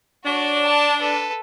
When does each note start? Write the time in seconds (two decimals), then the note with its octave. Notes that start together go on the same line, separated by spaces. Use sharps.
0.25 D4 F#4 C#5
0.63 A5 D6
1.00 A4 B4